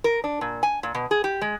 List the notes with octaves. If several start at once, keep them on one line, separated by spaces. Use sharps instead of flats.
A#4
D4
A#2
G#5
A#2
B2
G#4
G4
G#3